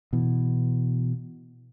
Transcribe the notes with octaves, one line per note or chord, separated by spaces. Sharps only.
B2 E3